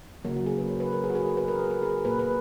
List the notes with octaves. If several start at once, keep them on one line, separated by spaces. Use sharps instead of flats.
C#3 F#3 A#3 A#4
F#4
G#4
B4
C#5
B4
A#4
G#4
F#4
G#4
A#4
B4
A#4
G#4
A#4
G#4
A#2 A#3 B4
B4